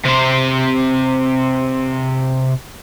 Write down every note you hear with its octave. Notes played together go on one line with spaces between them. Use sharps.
C3 C5